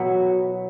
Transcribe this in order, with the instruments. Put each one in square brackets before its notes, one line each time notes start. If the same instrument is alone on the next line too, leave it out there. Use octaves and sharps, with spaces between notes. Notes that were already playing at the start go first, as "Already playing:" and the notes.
Already playing: [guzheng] B2 F#3 B3 E4 [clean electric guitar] F#4